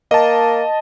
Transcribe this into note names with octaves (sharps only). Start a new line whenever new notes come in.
A#3 D#5 A5